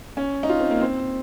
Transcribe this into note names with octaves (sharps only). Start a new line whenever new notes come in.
C#4
D#4
F4
C4
A#3
C4